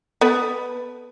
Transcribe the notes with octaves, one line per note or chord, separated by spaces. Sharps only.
B3 A4 B4